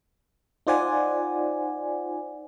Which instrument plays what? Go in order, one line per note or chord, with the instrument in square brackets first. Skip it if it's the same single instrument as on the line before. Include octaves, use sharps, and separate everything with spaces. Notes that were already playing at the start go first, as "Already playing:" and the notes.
[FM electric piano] D#4 F4 C5 D5 F#5 G#5